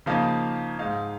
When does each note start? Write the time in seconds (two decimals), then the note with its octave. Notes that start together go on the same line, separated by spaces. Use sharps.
0.06 C#3 F3 A#3 D#4 F5
0.79 G#2 G#3 D#4 F5